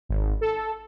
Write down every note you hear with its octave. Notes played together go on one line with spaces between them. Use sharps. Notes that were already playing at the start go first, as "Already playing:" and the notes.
G#1
A4